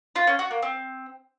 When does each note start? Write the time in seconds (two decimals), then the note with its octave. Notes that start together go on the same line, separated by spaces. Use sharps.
0.16 F4
0.27 C#4
0.39 F#4
0.51 A#3
0.62 C4